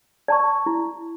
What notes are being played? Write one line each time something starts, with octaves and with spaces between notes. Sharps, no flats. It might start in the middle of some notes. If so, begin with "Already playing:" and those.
D5 A5 C#6
E4